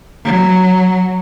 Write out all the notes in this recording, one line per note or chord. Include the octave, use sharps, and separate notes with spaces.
F#3